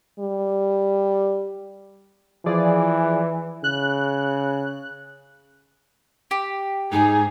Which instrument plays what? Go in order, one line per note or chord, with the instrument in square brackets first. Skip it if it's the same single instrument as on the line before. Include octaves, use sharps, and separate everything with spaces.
[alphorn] G3
[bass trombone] E3 [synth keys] F3 G#4 D5
[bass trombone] C#3 [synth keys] F#6
[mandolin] G4
[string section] G#2 G#4 [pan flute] D#4